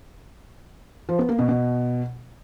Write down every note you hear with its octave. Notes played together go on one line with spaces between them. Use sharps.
F3
B3
A#3
B2
B2